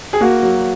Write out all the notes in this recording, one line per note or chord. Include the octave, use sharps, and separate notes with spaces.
G#4
A#3 F#4
F#3